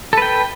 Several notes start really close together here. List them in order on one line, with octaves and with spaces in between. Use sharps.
A4 B4 G5